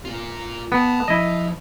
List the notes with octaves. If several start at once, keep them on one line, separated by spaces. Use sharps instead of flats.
F4 A#4
B3 G5 A5
F3 E4 D#5